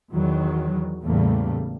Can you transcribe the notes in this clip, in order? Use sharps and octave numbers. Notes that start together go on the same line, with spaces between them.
E2 D#3 F#3
E2 A2 C#3 G3 A3 A#3